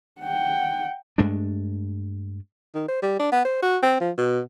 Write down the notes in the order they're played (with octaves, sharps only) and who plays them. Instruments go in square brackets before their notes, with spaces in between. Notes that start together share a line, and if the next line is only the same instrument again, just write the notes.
[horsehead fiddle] F#5 G5
[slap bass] G2 G#3 A3 D4
[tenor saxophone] D#3
C5
G3
D4
B3
C5
F#4
C4
F3
B2